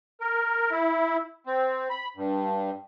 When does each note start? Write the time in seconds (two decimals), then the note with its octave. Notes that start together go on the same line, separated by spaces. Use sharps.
0.21 A#4
0.71 E4
1.46 C4
1.90 B5
2.17 G2